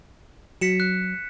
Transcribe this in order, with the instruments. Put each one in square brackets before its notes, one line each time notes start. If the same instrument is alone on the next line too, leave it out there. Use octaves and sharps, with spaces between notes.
[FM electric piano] F#3 [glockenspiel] B6 C#7 E7
[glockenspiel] F#6